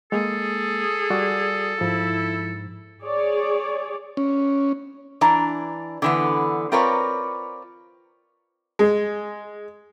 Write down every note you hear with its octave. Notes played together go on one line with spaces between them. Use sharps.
G#3 A#3 G#4 A4
G3 F#4 D5
G#2 F3 E4
G#4 C#5 D5
C#4
E3 D4 A#5
D3 E3 B3
C4 F4 A#4 B4 C#5 D5
G#3